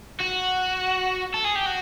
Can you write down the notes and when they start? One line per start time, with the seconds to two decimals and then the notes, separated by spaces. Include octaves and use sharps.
0.20 F#4
1.34 A4
1.44 G#4
1.56 G4
1.66 F#4